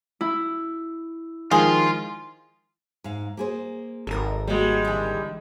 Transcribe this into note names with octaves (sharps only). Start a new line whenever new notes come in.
E4
D#3 F3 G#3 F4 G#4
G#2 F5
A#3 G#4 C5
G#1 A4 A#4
G3 G#3 A#3 F#4
D3 E3